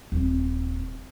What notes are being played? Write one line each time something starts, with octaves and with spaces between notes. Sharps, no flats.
D#1 C4